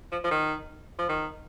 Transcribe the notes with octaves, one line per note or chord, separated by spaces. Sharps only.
F3
F3
D#3
F3
D#3